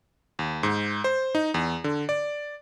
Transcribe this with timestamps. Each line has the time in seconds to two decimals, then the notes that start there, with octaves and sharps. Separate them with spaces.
0.39 D#2
0.63 G#2
1.04 C5
1.35 D#4
1.54 E2
1.84 D3
2.09 D5